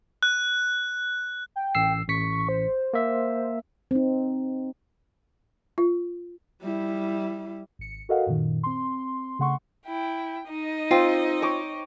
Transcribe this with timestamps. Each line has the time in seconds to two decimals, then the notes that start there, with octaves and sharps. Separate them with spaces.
0.23 F#6
1.56 G5
1.75 A1 E6 C7
2.09 A1 C#6 B6 C#7
2.49 C5
2.93 A#3 E5
3.91 C4 D#4
5.78 F4
6.63 G3 E4
7.79 G#1 C#7
8.09 F#4 A4 A#4 D#5 F5 F#5
8.26 F#2 A#2 D#3
8.63 C4 C6
9.39 C#3 A3 F#5 C6 C#6
9.87 E4 G5
10.48 D#4 D#5
10.91 C4 F4 G5 D6
11.42 C#5 D6